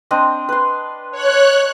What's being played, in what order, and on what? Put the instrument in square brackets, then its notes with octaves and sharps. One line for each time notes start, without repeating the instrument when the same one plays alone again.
[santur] C4 D4 D#5
B4 C6
[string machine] C#5 F#6